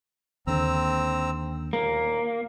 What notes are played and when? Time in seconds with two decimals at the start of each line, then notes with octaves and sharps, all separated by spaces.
0.47 D#2 D3 C4 A#5 E6
1.73 D#2 A#2 A#3